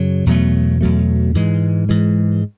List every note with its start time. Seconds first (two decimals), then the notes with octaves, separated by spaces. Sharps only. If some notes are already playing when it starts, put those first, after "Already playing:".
Already playing: F#2 C#3 F#3
0.26 E2 B2 F#3 A3
0.81 E2 B2 F#3 A3
1.35 G#2 E3 G#3
1.89 G#2 E3 G#3